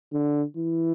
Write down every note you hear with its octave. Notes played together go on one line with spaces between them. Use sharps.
D3
E3